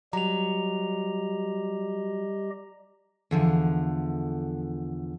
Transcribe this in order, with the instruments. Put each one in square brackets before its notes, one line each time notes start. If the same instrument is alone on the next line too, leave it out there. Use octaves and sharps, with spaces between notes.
[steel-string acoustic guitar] F#3 [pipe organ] G3 G4 D#5 [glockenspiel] A#5 F7
[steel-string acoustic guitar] E2 D3 F3